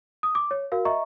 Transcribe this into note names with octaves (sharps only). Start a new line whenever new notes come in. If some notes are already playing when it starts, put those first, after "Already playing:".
D#6
D6
C#5
F#4 A#4 F5
D#5 E5 A#5 C#6